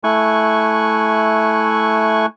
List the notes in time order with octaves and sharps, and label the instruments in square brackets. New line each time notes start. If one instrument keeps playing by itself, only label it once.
[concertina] A3 E4 G#5 C#6 F#6